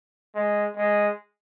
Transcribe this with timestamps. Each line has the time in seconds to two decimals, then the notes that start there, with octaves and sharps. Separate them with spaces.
0.35 G#3
0.77 G#3